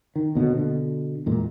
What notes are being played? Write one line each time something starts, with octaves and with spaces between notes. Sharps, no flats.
D#3
D#2 B2 D3
B2 D3
E2 A#2 G#3